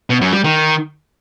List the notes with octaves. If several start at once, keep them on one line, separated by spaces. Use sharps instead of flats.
B2
F#2
G3
D#3